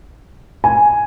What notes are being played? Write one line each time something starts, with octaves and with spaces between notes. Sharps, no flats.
G#5